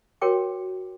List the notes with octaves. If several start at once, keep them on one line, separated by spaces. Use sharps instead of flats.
F#4 A#4 C#5 G5 D6